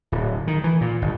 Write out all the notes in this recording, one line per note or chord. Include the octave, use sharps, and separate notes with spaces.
D1
D#3
E3
A#2
G1